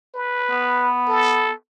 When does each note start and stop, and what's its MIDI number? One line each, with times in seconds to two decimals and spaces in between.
0.15 0.93 71
0.51 1.50 59
1.09 1.53 69